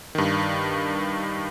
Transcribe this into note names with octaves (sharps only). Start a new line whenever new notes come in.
G2 D#3